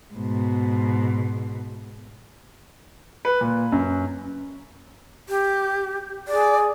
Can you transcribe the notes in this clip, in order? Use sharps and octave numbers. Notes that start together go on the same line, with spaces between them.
G#2 B2
B4
A#2
F#2
G4
G#4 D5